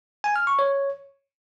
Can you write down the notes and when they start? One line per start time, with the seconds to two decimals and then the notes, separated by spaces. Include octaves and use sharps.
0.24 G#5
0.36 F6
0.47 C#6
0.59 C#5